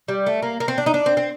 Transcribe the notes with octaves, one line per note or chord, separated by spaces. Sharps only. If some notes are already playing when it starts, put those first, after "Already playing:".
G3
A3
A#3
A#3
C4
D4
D#4
D4
C4
C4